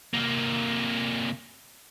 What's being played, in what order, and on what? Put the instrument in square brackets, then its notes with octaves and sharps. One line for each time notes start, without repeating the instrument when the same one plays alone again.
[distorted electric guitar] C3 A#3